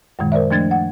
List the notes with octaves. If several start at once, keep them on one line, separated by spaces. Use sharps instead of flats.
F#2 A#2 D#3 G#3
A#4 C5 D5 E5
F3 A3 D4 G#6 A6
F#5